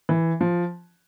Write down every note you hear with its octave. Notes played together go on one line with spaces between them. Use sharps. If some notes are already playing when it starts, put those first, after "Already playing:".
E3
F3